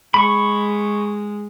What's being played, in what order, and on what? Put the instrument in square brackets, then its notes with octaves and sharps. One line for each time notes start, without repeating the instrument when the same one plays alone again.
[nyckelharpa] G#3 [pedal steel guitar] B5 C#6